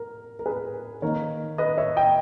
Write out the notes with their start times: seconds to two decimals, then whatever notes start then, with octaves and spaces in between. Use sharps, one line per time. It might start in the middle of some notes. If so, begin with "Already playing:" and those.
Already playing: A#4
0.39 A#4
0.46 G#4 B4
1.02 D#3 A#3 D#4 A#4 C#5
1.58 B4 D#5
1.78 C#5 E5
1.97 D#5 G5